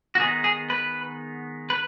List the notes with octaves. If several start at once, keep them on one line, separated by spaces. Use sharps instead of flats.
F#4
D#3 G#3 B3 D#4 G#4
G#4
B4
B4